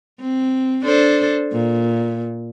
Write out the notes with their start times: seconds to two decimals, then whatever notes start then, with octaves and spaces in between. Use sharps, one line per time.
0.20 C4
0.85 D4 A4 C5
1.53 A#2